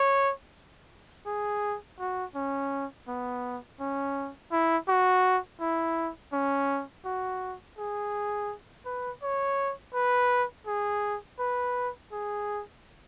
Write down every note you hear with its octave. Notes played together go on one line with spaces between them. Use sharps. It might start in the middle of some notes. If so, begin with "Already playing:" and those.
Already playing: C#5
G#4
F#4
C#4
B3
C#4
E4
F#4
E4
C#4
F#4
G#4
B4
C#5
B4
G#4
B4
G#4